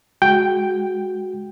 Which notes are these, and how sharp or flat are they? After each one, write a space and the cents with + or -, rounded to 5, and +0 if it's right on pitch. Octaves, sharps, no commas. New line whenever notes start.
G#3 -5 F#4 +0 G5 +0